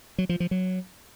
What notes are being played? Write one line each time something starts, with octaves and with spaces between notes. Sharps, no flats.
F#3
F3
F3
F#3